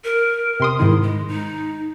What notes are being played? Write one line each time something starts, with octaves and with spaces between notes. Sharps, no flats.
A#4
C3 C6 D#6
G#2 D#3 E4
G#3
D#4